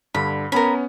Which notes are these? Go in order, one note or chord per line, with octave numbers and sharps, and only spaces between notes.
G2 D3 B5
B3 C#4 A#4 B5